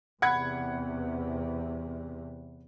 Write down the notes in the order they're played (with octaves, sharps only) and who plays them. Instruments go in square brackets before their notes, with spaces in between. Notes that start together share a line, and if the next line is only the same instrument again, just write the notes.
[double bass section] E2 C3 [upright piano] F#5 B5 G#6